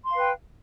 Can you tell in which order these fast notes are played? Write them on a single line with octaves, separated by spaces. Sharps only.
C6 F5 B4 G5